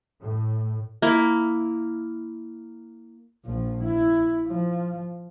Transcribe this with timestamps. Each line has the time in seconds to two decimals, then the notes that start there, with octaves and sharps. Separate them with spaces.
0.20 A2
1.02 A#3 E4
3.45 A#1 F3
3.83 E4
4.47 F3